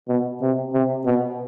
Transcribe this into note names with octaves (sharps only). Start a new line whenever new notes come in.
B2
C3
C3
B2